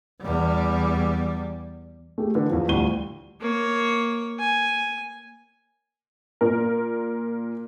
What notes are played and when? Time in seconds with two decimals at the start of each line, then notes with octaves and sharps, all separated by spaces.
0.22 E2 G3
2.18 A3 G4 G#4
2.35 D3 E3 B3
2.50 E2 F3
2.68 A1 D2 G3 F4 D#7 G7
3.40 A#3 C#5
4.39 G#5
6.41 A#2 A#4